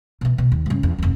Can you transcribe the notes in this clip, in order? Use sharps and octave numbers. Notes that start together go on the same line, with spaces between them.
B2 E3
B2
D#2
G2 C#3
E2
F1 D#2